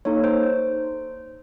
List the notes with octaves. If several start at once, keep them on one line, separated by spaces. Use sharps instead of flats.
A#3 D#4 A4 C#5
C5